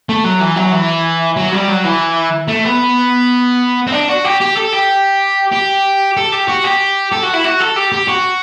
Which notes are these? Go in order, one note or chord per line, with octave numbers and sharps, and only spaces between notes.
A3
F#3
E3
F#3
E3
F#3
G3
F#3
E3
A3
B3
C4
D4
F#4
G4
G4
A4
G4
G4
A4
G4
F#4
G4
A4
F#4
E4
F#4
A4
G4
G4
F#4